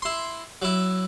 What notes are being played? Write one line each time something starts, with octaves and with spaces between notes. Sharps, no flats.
E4 C6
F#3 E4